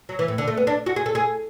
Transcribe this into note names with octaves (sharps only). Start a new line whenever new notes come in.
F#3
E3
A2
D3
A3
B3
D4
F#4
G#4
A4
G#4